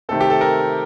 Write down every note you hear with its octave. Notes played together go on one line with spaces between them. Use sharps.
C3 D#3 A3 C4 A4
G4
A4
A#4